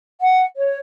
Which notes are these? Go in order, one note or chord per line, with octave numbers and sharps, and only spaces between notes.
F#5
C#5